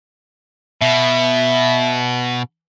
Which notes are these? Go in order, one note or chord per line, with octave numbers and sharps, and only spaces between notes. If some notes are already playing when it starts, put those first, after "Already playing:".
B2 E5